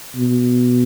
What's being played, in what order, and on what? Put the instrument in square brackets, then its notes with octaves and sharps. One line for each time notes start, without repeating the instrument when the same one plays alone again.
[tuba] B2